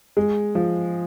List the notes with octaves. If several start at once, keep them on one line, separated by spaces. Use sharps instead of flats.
G#3
F3